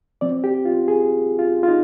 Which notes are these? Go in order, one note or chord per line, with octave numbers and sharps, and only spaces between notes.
F3 C4 D5
G4
F4
G#4
F4
F4
D#4